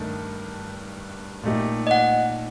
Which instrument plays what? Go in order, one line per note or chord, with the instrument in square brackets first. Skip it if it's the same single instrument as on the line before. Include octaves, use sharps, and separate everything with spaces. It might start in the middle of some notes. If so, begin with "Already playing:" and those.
Already playing: [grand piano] G2 D#3 A3
A#2 A3 D#4 G4
[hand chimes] D#5
F#5